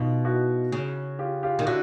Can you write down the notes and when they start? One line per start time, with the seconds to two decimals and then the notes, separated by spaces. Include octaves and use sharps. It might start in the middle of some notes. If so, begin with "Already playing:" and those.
Already playing: B2 D#4 F4
0.25 E4 F#4
0.72 C#3
1.19 F4 G4
1.43 F4 G4
1.59 D#3
1.66 D3 E4 F#4